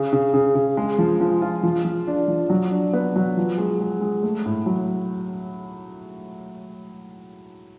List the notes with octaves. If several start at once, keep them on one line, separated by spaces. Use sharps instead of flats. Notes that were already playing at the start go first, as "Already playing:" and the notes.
Already playing: C#3
C#3
C#3
C#3
G#3
F3
F3
F4
F3
F3
D4
F3
F#3
D4
B3
F#3
F3
G#3
G#3
G#3
A3
A2
F#3